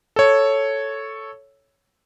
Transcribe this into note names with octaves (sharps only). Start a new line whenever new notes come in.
A4 C#5